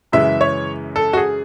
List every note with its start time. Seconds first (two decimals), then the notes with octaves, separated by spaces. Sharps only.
0.12 F#2 C#3 E3 G#3 E5
0.41 C#5
0.96 A4
1.13 F#4
1.17 G#4